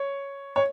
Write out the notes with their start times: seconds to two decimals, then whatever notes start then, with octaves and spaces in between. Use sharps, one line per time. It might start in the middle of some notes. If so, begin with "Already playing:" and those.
Already playing: C#5
0.56 C#5